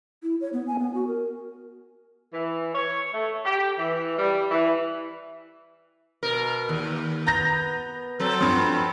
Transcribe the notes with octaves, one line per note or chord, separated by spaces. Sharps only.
E4
C#5
B3
G#5
B3
F#4
A#4
E3
C#5
A3
G4
E3
G3
E3
B2 A#4
D#2
B3 A#5 G6 A#6
F#3 C4 A4
G2 F3